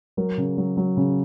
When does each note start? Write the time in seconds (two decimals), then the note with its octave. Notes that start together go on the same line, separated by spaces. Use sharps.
0.17 F#3 A#4
0.37 C#3
0.57 F#3
0.77 F#3
0.97 C#3